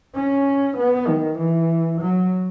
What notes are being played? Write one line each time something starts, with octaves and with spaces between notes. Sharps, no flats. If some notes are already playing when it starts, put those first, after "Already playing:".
C#4
B3
D#3
E3
F#3